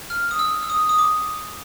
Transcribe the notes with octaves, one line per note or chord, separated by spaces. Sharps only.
F6
D#6
E6
E6
D#6
D#6
D6